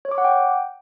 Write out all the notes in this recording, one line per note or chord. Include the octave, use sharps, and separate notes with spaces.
C#5
D6
F#5
G5